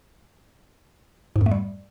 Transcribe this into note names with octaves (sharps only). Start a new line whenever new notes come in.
G#2
F2
A3
G3